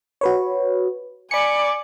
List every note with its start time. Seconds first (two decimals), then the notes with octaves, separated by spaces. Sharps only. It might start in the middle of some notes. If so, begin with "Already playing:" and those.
0.21 F#4 B4 C#5
1.31 D5 G#5 B5 C#7